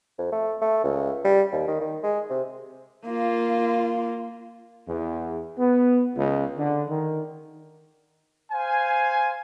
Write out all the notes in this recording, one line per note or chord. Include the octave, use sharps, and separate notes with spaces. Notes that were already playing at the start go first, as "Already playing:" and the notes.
F2
A3
A3
C#2
G3
D#2
D#3
D#3
G#3
C3
A#3 F4
E2
B3
C#2
D3
D#3
C5 F5 G#5